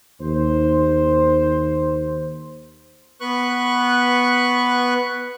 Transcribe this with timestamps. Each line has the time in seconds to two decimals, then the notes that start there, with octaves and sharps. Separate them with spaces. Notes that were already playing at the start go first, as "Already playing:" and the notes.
0.21 D#2 C5
3.20 B3 B4 C#6 F#6